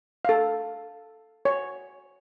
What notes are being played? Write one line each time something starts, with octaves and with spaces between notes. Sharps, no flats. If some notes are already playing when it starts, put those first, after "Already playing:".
A4 F5
C#5